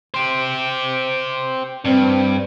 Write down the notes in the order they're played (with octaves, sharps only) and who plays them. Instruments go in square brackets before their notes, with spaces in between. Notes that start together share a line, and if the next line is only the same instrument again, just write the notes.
[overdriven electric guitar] G4 C5
[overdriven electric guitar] G2 [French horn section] C4